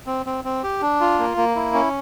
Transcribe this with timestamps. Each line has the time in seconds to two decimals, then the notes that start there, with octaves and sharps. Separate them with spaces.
0.07 C4
0.26 C4
0.44 C4
0.63 G4
0.81 D4
1.00 F4
1.19 A#3
1.37 A#3
1.55 E4
1.74 C#4